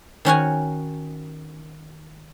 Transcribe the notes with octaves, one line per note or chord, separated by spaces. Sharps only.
D#3 C#4 F#4 G#5